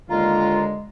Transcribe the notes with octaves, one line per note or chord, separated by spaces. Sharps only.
D#2 D3 G#3 F4 A#5